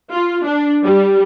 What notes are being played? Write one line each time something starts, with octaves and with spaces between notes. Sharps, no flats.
F4
D4
G3